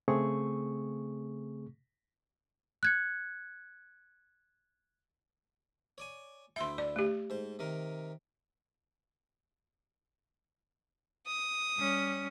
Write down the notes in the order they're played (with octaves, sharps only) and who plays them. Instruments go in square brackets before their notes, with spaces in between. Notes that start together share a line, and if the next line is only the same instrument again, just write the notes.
[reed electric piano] C#3 A3 C4 G#4 C#6
[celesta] F#6 G#6 C#7
[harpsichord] C#5 D5 G#5
[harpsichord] D2 E4 G5 [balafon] E5 C6
[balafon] D5
A3 G4
[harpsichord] G#2 C5
C3 D#3 A#4
[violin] D#6
[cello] G3 C#4